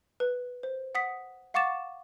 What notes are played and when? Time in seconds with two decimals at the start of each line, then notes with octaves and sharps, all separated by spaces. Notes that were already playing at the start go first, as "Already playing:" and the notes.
0.20 B4
0.63 C5
0.95 F#5 D#6 B6
1.54 F5 F#5 C#6 D6 A6 E7